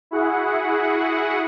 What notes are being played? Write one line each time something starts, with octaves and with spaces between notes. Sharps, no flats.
E4 F#4 G#4 F#5